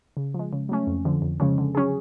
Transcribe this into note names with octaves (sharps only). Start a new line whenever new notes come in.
C#3
F3 G#3
C#3
F#3 A3 C#4
F2
D3 F3
F2
C#3 F3 G#3 C#4
D3
F#3 C#4 G#4